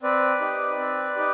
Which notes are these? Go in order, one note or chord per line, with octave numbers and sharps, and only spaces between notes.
C4 B4 D5
D#4 G4
C4
D#4 G4